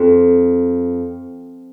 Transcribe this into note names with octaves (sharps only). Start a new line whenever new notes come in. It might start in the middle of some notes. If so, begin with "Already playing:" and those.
Already playing: F2